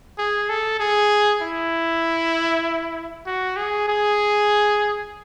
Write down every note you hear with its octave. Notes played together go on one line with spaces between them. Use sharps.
G#4
A4
G#4
E4
F#4
G#4
G#4